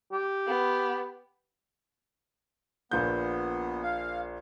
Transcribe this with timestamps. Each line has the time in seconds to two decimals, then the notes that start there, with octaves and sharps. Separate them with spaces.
0.12 G4
0.48 B3
2.91 A#1 A#2 B3 G6
3.83 F5